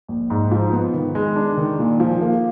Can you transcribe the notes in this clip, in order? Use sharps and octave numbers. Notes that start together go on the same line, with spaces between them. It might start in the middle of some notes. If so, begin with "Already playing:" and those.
A#1
G#2
F3
B3
D#3
G#3
D4
D#3
A#2
F3
A#3